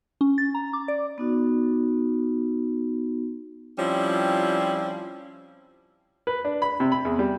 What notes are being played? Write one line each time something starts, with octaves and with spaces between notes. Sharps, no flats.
C#4
A6
A#5
D6
D5
B3 D#4 F#4
F3 G3 C4 C#4 E4
B4
D4
B5
C3
B5
E2
G3